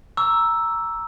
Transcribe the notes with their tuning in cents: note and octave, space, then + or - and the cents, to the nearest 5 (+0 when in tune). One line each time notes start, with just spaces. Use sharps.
A#5 +0 C#6 +40 E6 +0